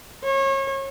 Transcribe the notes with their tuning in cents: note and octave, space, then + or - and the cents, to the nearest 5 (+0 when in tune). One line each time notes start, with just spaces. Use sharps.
C#5 -30